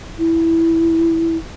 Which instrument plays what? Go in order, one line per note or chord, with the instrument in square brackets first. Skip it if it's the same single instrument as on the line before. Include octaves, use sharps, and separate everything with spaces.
[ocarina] E4